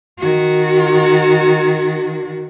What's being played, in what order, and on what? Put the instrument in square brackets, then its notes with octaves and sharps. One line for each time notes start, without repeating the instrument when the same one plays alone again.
[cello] D#3 F#4